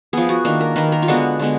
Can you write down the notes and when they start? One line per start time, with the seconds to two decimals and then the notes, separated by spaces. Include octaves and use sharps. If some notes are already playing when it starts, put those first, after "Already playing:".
0.13 F3 B3 G#4
0.29 F#4
0.45 D#3 A#3 D4
0.61 A#4
0.76 D#3 A#3 B4
0.92 A#4
1.02 F4
1.08 D3 G#3 B3 F#4
1.39 D3 G#3 B3